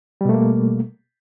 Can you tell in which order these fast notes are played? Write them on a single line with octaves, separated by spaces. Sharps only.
G3 B2 A3 A#3